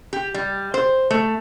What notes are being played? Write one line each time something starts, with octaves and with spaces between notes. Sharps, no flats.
G4
G3
C5
A3